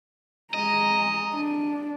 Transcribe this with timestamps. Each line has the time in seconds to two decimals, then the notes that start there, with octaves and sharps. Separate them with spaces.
0.54 G#3 D#5 A#5
1.33 D4